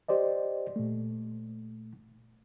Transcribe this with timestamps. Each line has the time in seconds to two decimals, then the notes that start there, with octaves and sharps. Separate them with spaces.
0.08 G4 C5 D5 D#5
0.76 A#2 A3